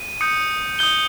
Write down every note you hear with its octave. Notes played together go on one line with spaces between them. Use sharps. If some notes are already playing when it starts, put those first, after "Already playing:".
Already playing: D#7
D#6 G6 C#7
D#6 G6 G7